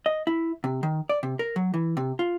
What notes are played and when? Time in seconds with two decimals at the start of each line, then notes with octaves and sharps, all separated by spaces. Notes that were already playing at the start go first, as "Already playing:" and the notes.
0.06 D#5
0.27 E4
0.64 C3
0.83 D#3
1.09 D5
1.23 C3
1.39 A#4
1.56 F#3
1.74 E3
1.97 C3
2.19 F4